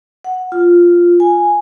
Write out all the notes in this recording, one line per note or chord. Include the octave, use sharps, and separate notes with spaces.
F#5
F4
G#5